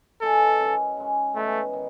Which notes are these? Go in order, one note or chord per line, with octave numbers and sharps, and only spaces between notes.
E3 G#3 C#4 A4
F#2 D#3 F#3 C#4
C#3 G#3 C#4
C#3 E3 A3 B3 D#4
D#3